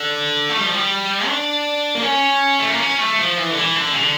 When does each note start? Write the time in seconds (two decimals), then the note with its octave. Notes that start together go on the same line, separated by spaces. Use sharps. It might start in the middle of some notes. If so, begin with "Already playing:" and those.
Already playing: D3
0.49 A3
0.58 G3
0.66 F3
0.74 G3
1.26 D4
1.95 A#3
2.02 C#4
2.60 A3
2.70 A#3
2.80 C#4
2.99 A3
3.19 F3
3.37 E3
3.50 D3
3.57 E3
3.76 D3
3.92 C#3
3.96 D3